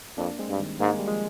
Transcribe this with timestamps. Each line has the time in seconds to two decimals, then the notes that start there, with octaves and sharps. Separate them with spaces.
0.18 F2 A#3 D4
0.39 G#3 C4
0.49 G2
0.60 D#3 G3
0.80 G#2 A#3
0.90 G#3
0.99 G3
1.08 F3 G#3